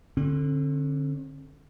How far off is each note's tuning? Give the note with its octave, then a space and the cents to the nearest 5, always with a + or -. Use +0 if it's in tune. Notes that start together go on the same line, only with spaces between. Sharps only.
D3 +0 C4 +45